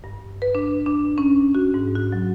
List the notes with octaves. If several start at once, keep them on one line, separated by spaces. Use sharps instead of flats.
G2
B4
D4
D4
C#4
F#4
G#2
F#4
F#3